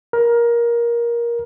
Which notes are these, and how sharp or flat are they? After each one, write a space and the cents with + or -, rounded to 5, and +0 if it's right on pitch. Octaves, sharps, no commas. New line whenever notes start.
A#4 +15